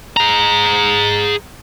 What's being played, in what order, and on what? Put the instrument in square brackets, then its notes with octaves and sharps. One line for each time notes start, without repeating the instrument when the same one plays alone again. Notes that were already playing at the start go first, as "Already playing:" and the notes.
[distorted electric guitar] G#4 A#5